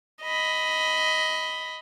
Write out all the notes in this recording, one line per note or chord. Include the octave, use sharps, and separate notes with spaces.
D#5 B5